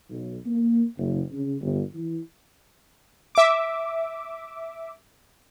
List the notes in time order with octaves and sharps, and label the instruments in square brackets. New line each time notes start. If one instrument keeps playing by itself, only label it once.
[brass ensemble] B1
A#3
F#1
C#3
G1
E3
[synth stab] E5 D6